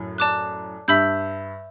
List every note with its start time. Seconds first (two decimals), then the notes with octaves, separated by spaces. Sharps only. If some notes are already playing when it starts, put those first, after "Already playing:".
Already playing: F#2 A2
0.18 D5 A5 D6 F#6
0.88 G2 E5 B5 E6 G6